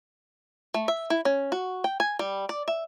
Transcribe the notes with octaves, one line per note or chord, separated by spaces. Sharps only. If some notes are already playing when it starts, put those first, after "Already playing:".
A3
E5
E4
C#4
F#4
G5
G#5
G3
D5
E5